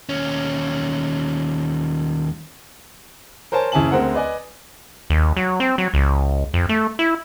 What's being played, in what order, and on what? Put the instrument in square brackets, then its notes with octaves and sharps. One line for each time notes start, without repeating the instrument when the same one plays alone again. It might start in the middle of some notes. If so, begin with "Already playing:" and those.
[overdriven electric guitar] D#2 C#4
[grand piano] A#4 C5 C#5 G#5 A5
F#1 C#3 E4 G#5 A5 F#7
D2 C4 G#4 A#4 F#5
B4 D5 D#5 G#5
[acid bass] D#2
F#3
C4
F#3
C#2
F2
A3
E4